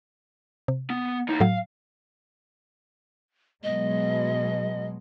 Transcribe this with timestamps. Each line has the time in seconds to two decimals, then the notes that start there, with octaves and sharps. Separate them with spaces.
0.68 C3
0.90 B3
1.28 E2 D#4
1.40 A2 F#3 F5
3.63 B2 F#3 G#3 D#5